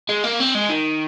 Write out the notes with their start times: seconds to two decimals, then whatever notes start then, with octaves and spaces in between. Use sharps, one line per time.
0.09 G#3
0.24 A#3
0.40 C4
0.55 G#3
0.70 D#3